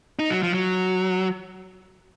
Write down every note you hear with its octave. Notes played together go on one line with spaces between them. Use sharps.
D#4
F#3
F3
F#3